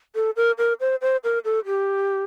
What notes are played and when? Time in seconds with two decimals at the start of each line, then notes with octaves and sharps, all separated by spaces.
0.15 A4
0.36 A#4
0.58 A#4
0.80 C5
1.01 C5
1.24 A#4
1.45 A4
1.66 G4